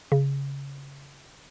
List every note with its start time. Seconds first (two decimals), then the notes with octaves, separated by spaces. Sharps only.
0.12 C#3